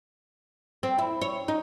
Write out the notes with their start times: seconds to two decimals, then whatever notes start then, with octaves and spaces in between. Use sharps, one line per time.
0.83 C4
0.98 E4
1.21 C#5
1.48 D#4